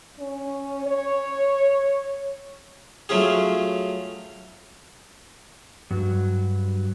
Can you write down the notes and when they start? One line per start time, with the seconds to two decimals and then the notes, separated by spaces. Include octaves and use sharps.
0.19 C#4
0.86 C#5
3.09 F#3 A3 C#4 F4 G#4
5.91 G2 F#3